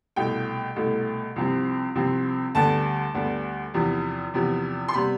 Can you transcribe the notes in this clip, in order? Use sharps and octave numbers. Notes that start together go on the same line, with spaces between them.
C2 B2 A3 G5
C2 B2 A3
C2 C3 F3 C4
C2 C3 F3 C4
D2 D3 G3 B3 A5
D2 D3 G3 B3
E2 C3 F3 B3
E2 C3 F3 B3
C6
C3 G3 B3 B5